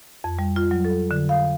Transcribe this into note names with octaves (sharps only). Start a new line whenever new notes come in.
F2
G3
F4
F#3
A4
D3
F5